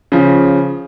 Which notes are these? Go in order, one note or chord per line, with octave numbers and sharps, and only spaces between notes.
C#3 F3